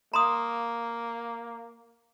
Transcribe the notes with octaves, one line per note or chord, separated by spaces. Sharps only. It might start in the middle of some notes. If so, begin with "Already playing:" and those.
A#3 A#5 C6 D#6